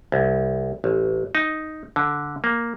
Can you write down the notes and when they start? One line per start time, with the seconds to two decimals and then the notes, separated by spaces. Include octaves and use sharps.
0.12 C2
0.84 A1
1.35 D#4
1.96 D3
2.44 A#3